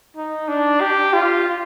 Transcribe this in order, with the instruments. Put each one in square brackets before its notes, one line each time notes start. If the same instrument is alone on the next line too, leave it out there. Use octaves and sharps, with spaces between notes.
[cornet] D#4
D4
G4
F4